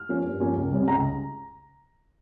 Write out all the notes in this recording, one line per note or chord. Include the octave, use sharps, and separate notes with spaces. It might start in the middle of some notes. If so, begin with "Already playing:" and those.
Already playing: F6
F3 A#3 C#4
G2
F3 A#3 C#4
C#2
C3 G3 C#4
C#2 A#5